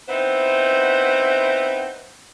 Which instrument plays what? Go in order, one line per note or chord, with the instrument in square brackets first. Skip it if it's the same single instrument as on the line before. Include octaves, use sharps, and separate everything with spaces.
[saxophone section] B3 C4 D#4 E4 B4 C5